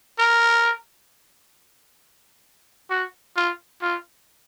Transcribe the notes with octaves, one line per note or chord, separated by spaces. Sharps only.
A#4
F#4
F4
F4